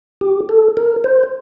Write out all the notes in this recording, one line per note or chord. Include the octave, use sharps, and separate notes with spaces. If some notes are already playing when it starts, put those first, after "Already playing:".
G4
A4
A#4
C5